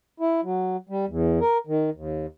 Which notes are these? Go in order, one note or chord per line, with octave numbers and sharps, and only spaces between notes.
E4
F#3
G3
E2
A#4
D#3
D#2